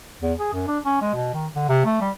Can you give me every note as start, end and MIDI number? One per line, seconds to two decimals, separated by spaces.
0.22 0.33 40
0.39 0.51 68
0.53 0.64 42
0.67 0.79 62
0.85 1.00 61
1.02 1.13 56
1.14 1.31 47
1.34 1.47 51
1.56 1.64 50
1.69 1.84 48
1.85 1.99 57
2.01 2.10 55